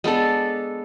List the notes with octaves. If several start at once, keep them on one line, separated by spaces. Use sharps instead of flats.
G#3 B3 D4 A4